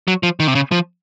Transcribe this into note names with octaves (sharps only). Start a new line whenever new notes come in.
F#3
F3
D#3
C3
C#3
F3